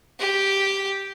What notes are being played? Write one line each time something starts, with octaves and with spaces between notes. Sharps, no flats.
G4